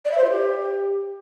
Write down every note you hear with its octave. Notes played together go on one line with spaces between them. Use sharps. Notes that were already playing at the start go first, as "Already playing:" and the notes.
D5
E5
C5
F4
G4